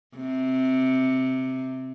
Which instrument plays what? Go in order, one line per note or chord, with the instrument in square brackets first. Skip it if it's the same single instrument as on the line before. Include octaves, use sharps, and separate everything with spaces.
[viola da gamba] C3